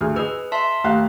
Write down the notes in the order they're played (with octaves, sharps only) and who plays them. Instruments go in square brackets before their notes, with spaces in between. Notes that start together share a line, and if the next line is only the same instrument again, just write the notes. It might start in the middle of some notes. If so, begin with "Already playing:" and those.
[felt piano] D2 G#4 F6
[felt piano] G#4 D#5 E6 [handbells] B4
[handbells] E5 A5 C6
[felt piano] D#2 F5 F#6 [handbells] A3